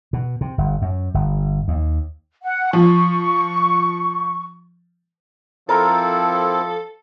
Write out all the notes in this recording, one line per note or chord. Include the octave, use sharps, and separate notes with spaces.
B2
C3
G1
F#2
G1
D#2
F#5
F3 C#6
F3 C4 E4 A4 A#4